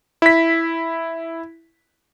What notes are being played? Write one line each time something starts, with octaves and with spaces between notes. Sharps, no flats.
E4 B6